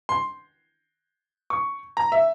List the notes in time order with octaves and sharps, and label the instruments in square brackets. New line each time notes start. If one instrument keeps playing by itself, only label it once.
[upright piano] C6
C#6
A#5
E5